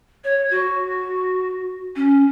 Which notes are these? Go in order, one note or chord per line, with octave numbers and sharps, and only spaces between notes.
C#5
F#4
C#4